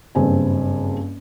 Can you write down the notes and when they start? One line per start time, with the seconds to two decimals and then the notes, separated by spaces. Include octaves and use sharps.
0.15 F#1 G2 C4 G#5